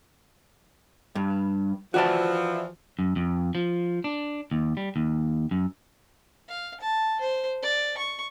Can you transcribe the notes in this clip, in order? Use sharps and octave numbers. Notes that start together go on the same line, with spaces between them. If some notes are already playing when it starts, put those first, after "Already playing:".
G2
E3 F3 F#4 D5 A5
F#2
F2
F3
D4
D#2
G3
D#2
F#2
F5
A5
C5
D5
C#6